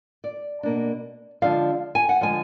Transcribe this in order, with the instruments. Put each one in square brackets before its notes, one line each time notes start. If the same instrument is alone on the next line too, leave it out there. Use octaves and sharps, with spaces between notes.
[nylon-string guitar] D5
B2 A#3 D4
D3 F3 G#3 D4 F5
G#5
F#5
D3 F3 G#3 G#5